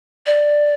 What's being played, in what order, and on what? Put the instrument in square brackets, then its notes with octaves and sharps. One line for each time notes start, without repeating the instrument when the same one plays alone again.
[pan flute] D5